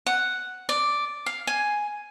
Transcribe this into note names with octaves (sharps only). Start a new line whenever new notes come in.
F#5
D5
F5
G#5